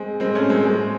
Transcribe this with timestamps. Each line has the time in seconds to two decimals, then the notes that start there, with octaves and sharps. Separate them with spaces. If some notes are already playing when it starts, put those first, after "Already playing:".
Already playing: G#3 C4
0.20 G#3 C4
0.35 A3 C#4
0.49 G#3 C4
0.65 G#3 C4